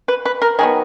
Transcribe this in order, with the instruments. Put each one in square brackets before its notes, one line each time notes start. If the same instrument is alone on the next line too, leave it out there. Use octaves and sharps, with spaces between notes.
[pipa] B4
B4
A#4
D#3 F#3 B3 G#4